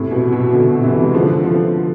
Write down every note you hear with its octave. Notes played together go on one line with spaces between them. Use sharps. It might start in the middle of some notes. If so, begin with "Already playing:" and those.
Already playing: A2 C3
B2
B2
B2 D3
C3 E3
G#3
D3 F3
D3 F3